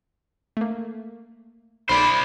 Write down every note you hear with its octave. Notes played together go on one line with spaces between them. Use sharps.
A3 A#3
B1 C5 D5 B5 C6